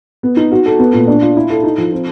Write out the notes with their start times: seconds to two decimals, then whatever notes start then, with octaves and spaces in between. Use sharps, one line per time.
0.23 B3
0.37 D#4
0.52 F#4
0.66 A4
0.79 B3
0.93 A#2
1.08 D4
1.22 F4
1.36 E4
1.50 A4
1.63 D#4
1.78 F3
1.92 C4